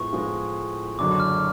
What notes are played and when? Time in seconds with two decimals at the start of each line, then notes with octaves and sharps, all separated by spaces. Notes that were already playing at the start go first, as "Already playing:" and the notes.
Already playing: A2 F3 G#3 B3 C#6
0.13 A2 F3 G#3 B3
0.99 F#1 F#2 D3 F#3 D6
1.20 F6